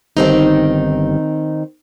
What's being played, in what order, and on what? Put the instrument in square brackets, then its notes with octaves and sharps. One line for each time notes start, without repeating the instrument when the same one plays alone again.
[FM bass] G1 [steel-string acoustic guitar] D#3 C4 D#4